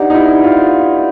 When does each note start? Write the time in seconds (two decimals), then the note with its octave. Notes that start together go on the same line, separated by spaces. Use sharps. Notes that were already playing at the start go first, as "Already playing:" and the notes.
Already playing: D4 D#4 G4 B4 D5 F#5
0.10 D#4
0.15 E4
0.44 F4